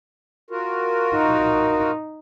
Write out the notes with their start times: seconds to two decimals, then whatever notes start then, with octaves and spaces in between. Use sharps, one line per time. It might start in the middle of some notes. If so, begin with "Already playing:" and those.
0.50 F4 F#4 A#4
1.15 D#4